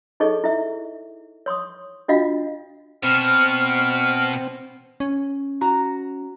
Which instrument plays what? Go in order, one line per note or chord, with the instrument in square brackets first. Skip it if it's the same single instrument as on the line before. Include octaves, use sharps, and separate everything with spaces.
[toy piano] D#4 G#4 A4 C#5 D#5 C#6
E4 E5
C#5 C6 C#6 D#6
D4 F4 F#4 D#5 F5
[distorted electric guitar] B2 [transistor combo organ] C4 [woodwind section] B5 C#6 F6
[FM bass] C#4
[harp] F#4 A#5